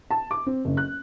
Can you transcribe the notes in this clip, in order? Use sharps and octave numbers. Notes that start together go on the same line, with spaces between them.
A5
D6
C4
F#1
F#6